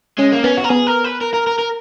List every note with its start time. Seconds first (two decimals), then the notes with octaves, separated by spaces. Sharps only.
0.18 G#3 C#4
0.32 A#3
0.44 B3 C#4
0.57 F#4
0.64 A#4
0.69 B3 G#4
0.87 A#4
1.04 B4
1.21 A#4
1.33 A#4
1.47 A#4
1.58 A#4